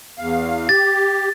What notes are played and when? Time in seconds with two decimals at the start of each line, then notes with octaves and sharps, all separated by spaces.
0.19 E2 F5
0.69 G4 A6